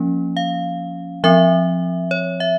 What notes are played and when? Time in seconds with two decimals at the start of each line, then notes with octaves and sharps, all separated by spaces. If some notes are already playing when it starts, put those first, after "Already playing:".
Already playing: F3 A#3 C#4
0.37 F5
1.24 F3 C4 E5
2.11 C#5
2.40 E5